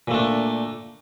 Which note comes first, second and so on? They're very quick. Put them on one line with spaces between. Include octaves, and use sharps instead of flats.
A#2 A3 D4